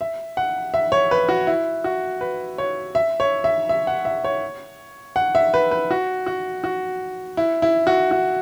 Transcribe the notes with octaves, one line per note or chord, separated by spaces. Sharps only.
E5
F#5
E5
C#5
B4
F#4
E4
F#4
B4
C#5
E5
C#5
E5
E5
F#5
E5
C#5
F#5
E5
B4
B4
F#4
F#4
F#4
E4
E4
F#4
F#4